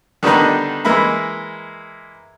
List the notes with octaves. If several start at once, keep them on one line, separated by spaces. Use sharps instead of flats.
D3 D#3 G3 B3 D4 D#4
E3 G#3 A#3 E4 B5